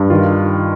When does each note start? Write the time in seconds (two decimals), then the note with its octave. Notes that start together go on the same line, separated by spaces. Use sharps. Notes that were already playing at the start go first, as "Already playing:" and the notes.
Already playing: G2
0.10 D#3 F4